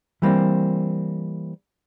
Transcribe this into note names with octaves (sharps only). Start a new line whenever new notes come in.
E3 G3 A#3 C4